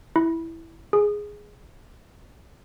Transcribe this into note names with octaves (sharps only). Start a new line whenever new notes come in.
E4
G#4